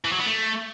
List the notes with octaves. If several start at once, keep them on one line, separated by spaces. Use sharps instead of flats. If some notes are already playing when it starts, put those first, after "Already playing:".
E3
F#3
B3
A3